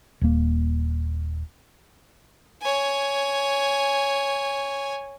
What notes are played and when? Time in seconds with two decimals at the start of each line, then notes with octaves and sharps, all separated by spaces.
0.21 D#1 A#3
2.62 C#5 G#5